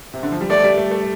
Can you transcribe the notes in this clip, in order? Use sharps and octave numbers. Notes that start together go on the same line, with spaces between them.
C3
D3
F3
G3
A3 D5
G3
A3
A3